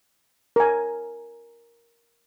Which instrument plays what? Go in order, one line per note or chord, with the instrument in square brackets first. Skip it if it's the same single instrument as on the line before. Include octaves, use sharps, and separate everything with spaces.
[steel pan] A#4 G#5